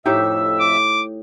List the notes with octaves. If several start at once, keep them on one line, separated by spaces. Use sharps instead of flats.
F2 A2 D#4 G4 E5 E6
D6